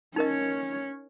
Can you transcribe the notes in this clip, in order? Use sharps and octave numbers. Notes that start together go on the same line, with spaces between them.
C#4 D#4 A#4 C#5 D#5